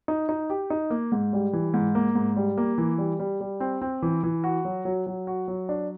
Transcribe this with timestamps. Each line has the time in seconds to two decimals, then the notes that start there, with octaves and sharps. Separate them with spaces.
0.08 D#4
0.29 D#4
0.50 G4
0.70 D#4
0.90 A#3
1.12 G#2
1.33 G3
1.53 E3
1.74 G#2
1.95 A#3
2.15 G#2
2.36 G3
2.58 A#3
2.78 E3
2.98 G3
3.19 G3
3.41 G3
3.60 C4
3.82 C4
4.02 E3
4.23 E3
4.44 F#4
4.65 F#3
4.85 F#3
5.07 F#3
5.27 F#4
5.48 F#3
5.69 D4